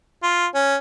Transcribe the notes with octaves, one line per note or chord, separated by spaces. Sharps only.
F4
C#4